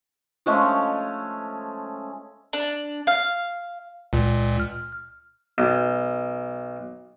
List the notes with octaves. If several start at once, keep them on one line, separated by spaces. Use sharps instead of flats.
F3 G#3 A3 C#4
D4
F5
C#2 A#2
F6
B1